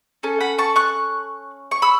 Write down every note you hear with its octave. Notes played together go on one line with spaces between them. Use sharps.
C#4 A4
F#5 B5
A5 C#6
C#6 F#6
C#6
B5 E6